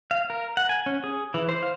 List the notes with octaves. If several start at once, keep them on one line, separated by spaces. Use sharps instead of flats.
F5
A#4
F#5
G#5
C#4
G#4
E3
C5
F5